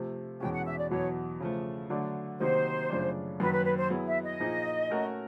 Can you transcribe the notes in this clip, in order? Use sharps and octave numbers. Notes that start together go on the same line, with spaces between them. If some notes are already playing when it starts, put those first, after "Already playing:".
Already playing: C3 F3 A3
E2 B2 G#3 C#4 G5
F#5
E5
D5
E2 B2 F#3 C#5
C#3 F3 A3
D3 F#3 A3 D4
C3 D#3 F#3 A#3 D#4 C5
F#2 C#3 F3 A3 D4
F#2 D#3 F#3 A#3 B4
B4
B4
C5
F#3 B3 E4 G#4 B4
E5
D#5
A#2 F3 A#3 D#4 G#4
A3 C#4 F#4 A#4